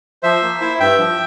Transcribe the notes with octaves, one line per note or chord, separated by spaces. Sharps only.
F3 C5 E5
A#3
E4
G2 E5 G5
F3